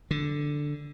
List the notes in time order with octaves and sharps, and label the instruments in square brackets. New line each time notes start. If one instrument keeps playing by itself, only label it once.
[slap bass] D3